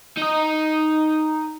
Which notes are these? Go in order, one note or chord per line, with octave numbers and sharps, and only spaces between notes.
D#4 D#5